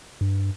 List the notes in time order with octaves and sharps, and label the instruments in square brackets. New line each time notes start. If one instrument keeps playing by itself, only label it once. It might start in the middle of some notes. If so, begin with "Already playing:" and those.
[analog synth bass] G2